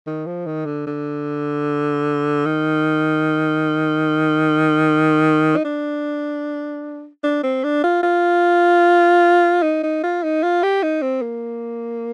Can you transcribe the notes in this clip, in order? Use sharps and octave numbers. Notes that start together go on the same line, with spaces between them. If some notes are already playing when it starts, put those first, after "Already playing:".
D#3
F3
D#3
D3
D3
D#3
D#4
D4
D4
C4
D4
F4
F4
D#4
D#4
F4
D#4
F4
G4
D#4
C4
A#3